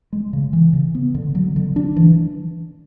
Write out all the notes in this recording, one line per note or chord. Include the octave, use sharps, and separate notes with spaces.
G#3
C#3
E3
C#3
B3
D3
F#3
D3
D4
E3